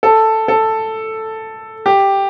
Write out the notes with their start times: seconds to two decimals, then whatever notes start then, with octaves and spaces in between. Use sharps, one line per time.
0.03 A4
0.48 A4
1.86 G4